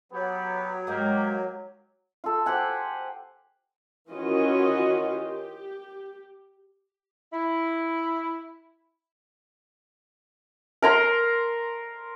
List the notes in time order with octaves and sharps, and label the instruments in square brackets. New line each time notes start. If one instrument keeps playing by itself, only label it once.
[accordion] F#3 [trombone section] B3 G4
[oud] G#2 G#3 [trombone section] A#3 G4
[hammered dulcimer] F4 A4
G4 C5 F#5 G#5
[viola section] D#3 E3 C#4 F4 F#4 D#5
G4
[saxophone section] E4
[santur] A#4 A#5 C6